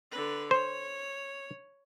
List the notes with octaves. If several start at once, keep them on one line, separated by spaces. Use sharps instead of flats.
D3 B4
C5 C#5